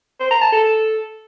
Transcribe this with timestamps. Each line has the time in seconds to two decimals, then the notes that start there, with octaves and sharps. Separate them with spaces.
0.20 C5
0.31 A#5
0.41 A5
0.52 A4